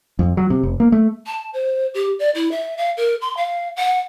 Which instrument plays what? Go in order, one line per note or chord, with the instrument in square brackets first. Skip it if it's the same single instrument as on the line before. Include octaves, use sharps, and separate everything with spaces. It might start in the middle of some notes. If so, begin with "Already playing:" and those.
[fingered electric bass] F2
F#3
C3
F1
A#3
A3
[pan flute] A5
C5
G4
D5
E4
E5
F5
A#4
C6
F5
F#5